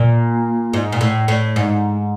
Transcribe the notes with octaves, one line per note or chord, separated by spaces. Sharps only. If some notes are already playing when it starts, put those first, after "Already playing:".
Already playing: A#2
G#2
A#2
A2
A2
G#2